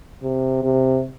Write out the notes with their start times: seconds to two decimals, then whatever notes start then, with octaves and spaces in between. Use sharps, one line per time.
0.22 C3
0.63 C3